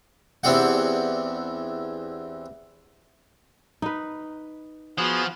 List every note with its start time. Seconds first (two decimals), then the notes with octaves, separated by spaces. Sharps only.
0.44 E2 E3 C4 D4 G4 F#5
3.82 D#4 B4
4.98 F3 B3 F#4 G#4